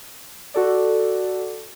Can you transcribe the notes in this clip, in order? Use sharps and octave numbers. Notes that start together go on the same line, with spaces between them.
F#4 A4 D5